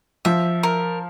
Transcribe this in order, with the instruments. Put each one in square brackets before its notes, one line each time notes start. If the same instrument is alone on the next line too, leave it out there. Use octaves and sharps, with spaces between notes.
[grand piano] F3 [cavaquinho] E5
[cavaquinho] A#4